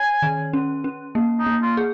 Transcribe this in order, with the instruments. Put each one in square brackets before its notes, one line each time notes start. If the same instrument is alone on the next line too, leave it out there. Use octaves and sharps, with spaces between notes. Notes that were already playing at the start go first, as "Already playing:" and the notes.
Already playing: [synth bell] C#5 [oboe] G#5
[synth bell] D#3
C#4
C#4
A#3
[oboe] D#4
[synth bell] A#3
[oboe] F4
[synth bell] G#4